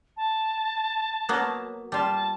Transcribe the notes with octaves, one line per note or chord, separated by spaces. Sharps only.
A5
F#3 A#3 B3
G3 F4 A5